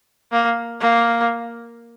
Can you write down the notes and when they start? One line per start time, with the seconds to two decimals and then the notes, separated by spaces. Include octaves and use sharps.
0.32 A#3
0.80 A#3